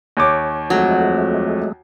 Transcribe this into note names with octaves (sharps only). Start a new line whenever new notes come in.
D#2 C#5 D6
F2 F#3 G#3 A3